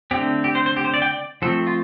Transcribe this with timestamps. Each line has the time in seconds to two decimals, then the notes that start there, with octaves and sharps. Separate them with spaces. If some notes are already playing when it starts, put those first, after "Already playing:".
0.11 D3 A3 C4 G4
0.44 G4
0.55 C5
0.66 C5
0.77 G4
0.85 C5
0.94 D5
1.02 G5
1.10 D5
1.42 F3 A3 C4 A4
1.67 F4